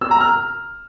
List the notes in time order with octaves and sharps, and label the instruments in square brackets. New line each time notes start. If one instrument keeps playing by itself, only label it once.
[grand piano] E6
A#5
F6